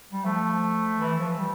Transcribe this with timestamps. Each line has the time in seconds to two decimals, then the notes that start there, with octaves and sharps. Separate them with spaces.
0.13 G3
0.25 F3 A3
1.00 E3
1.19 F3
1.37 G3